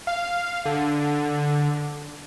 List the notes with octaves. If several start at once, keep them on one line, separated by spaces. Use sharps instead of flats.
F5
D3